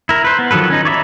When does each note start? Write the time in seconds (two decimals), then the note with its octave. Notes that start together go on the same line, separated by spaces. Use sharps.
0.09 E4 A#4
0.24 B4 C5
0.39 B3
0.51 D#3 F3 F#3 A4 B4
0.70 C#4 D#4
0.85 C#5 D5 E5 A#5 B5